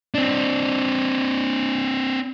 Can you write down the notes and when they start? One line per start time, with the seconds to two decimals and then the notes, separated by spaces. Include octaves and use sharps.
0.14 C4 D4